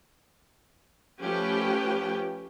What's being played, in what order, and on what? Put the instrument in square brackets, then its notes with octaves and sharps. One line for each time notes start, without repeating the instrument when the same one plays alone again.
[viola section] F3 A3 C#4 G4 B4 G5